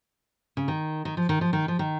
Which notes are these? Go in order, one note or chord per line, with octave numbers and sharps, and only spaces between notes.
C#3
D#3
D#3
F3
D#3
F3
D#3
F3
D#3